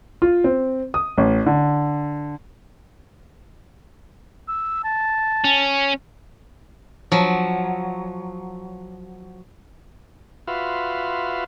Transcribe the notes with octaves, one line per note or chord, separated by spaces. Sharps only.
F4
C4
D#6
A1
D3
E6
A5
C#4
F3 F#3
F4 F#4 B4 E5 F5 C6